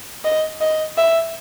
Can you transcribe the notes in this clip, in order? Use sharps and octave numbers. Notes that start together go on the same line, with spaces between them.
D#5
D#5
E5